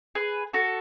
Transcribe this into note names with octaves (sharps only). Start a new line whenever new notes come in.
G#4 B4
F#4 A4